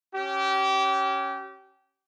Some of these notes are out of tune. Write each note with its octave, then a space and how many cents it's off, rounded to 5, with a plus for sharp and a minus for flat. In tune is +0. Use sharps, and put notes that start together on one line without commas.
C#4 +0 G4 -30